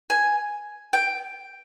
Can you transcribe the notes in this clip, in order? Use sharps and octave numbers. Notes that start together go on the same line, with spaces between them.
G#5
G5